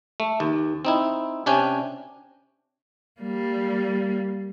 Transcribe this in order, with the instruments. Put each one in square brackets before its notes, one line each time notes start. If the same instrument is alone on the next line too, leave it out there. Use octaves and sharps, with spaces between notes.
[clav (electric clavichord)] A3
D#2
C4 D#4 E4
C3 C#4 D4 G5 G#5
[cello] G3 A#3